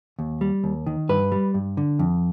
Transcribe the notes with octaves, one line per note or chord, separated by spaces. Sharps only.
D#2
G3
D#2
D#3
G2 B4
G3
G2
D3
F2